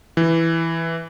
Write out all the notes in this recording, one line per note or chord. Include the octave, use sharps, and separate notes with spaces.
E3